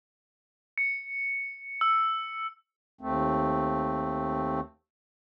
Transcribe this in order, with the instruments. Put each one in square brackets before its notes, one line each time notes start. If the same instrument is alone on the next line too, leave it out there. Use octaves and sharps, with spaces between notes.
[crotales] C#7
E6
[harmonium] D#2 A3 C4